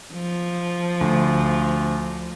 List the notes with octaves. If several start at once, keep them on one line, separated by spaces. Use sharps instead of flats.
F3
D2